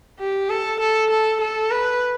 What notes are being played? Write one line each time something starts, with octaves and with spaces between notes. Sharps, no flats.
G4
A4
A4
A4
A4
B4